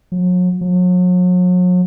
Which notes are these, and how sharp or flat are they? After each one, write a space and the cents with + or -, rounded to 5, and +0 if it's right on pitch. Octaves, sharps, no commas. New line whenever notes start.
F#3 -40
F#3 -40